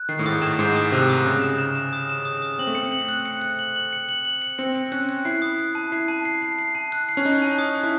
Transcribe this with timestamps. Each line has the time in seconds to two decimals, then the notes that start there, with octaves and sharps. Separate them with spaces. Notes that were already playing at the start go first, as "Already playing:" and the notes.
Already playing: F#6
0.09 D#3 C7
0.19 A2
0.26 G#2 D#6
0.42 A2 E7
0.59 G#2 C7
0.75 D#6
0.92 C3 F#6
1.09 D#6
1.26 C#3 F#6
1.42 E7
1.58 E7
1.75 E7
1.93 D#6
2.09 E7
2.25 D#6
2.42 D#6
2.59 C4 F#7
2.67 A3
2.75 C4 C#7
2.92 F#7
3.09 F#6
3.26 C#7
3.42 F#6
3.59 F#7
3.76 F#7
3.93 C#7
4.09 F#7
4.25 F#7
4.42 C#7
4.58 C4 C#7
4.75 C#7
4.92 C#4 F#6
5.09 F#6
5.25 E4 C7
5.42 D#6
5.59 F#6
5.75 A5
5.92 E4 C7
6.08 A5
6.25 C7
6.42 C7
6.59 C7
6.75 A5
6.92 F#6
7.09 C7
7.17 C#4
7.25 D#4 F#6
7.42 A5
7.59 D#6
7.76 F#6
7.83 E4